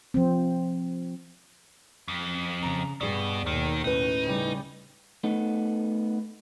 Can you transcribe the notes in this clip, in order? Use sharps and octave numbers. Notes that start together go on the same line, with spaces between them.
F3 C4
F2
C#3 A#5
G2 B2 G#4 D5
D#2 B2 D#3
A2 C#4 D#4 B4
C#3 G3
A3 B3 D#4